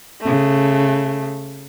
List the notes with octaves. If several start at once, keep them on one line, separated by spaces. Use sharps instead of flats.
C#3 A3